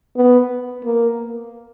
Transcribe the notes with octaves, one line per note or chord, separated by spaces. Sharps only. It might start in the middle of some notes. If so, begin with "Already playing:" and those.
B3
A#3